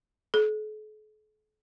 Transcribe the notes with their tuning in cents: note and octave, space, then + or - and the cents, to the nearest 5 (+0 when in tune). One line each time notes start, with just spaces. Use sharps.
A4 -45